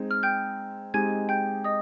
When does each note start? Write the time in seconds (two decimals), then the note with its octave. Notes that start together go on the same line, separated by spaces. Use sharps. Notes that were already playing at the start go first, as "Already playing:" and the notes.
Already playing: G#3 C4 D#4 G#4
0.11 F6
0.23 G5 G6
0.94 G#3 C4 D#4 G4 G#5 G#6
1.29 G5 G6
1.64 D#5 D#6